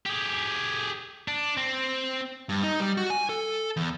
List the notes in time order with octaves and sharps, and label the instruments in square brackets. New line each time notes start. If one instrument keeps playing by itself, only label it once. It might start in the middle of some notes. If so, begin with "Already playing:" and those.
[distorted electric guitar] G4 G#4
D4
C4
[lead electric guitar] G2
D#4
G3
F#4
G#5
A4
E2